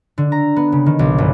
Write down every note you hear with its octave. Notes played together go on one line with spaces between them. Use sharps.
D3
A#5
B3
C#3
D#3
B1
G1